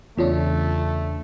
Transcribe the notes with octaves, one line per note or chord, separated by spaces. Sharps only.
E2 C#3 A3 B3 D4 F4 C#5